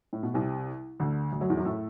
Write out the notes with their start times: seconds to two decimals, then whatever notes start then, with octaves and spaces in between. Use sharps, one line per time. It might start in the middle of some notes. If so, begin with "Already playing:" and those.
0.13 A2
0.23 B2
0.34 C2 C3
1.00 D2 D3
1.32 D2 D3
1.40 F#2 F#3
1.49 E2 E3
1.57 F#2 F#3
1.65 A2 A3